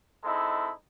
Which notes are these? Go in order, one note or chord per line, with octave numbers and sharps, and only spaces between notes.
G#3 C4 D#4 E4 A4